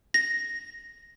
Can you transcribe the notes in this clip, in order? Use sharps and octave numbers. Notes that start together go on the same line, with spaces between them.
A#6